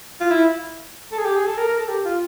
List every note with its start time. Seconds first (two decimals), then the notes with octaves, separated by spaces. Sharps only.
0.21 F4
0.31 E4
1.12 A4
1.18 G#4
1.26 G4
1.36 G#4
1.46 A4
1.57 A#4
1.68 A#4
1.79 A4
1.89 G4
2.05 F4